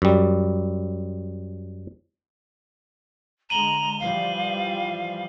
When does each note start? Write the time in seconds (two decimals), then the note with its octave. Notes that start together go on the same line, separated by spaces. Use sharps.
0.02 F#2 G3
3.50 D3 G#3 A#5 D#7 F#7 G7
4.00 E3 F3 G3 F5